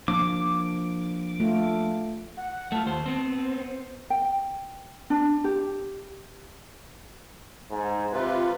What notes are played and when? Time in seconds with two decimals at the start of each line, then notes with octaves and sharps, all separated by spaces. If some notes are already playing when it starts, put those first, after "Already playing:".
0.08 F3 A#3 D4 D6
1.40 A3 F4
2.37 F#5
2.72 A3 F4 A5
2.86 D#2 C5
3.06 B3 C4
3.33 C5
4.10 G5
5.10 D4
5.44 G4
7.71 G#2
8.13 C3 F4 B4